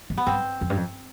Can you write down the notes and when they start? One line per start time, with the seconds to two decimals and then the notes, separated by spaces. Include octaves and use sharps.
0.10 F2
0.18 B3
0.27 G2 C4
0.61 F2
0.70 G2
0.77 F2